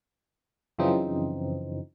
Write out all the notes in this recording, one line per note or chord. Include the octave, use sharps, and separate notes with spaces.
F#2 C#3 E3 F3 C4 D#4